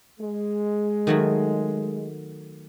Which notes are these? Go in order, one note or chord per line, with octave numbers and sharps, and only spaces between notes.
G#3
D#3 F#3 A3